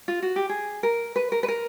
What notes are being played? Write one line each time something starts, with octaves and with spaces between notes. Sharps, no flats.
F4
F#4
G4
G#4
A#4
B4
A#4
B4
A#4